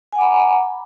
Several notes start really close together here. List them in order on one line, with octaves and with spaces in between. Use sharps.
G#5 F#5 D6 B5 A#5